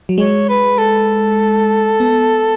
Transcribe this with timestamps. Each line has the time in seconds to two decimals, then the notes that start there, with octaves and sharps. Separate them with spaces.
0.09 F#3
0.18 G#3 C#5
0.49 B4
0.78 A4
2.00 B3